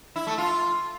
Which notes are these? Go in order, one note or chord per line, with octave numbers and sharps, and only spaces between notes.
E4
A3
F4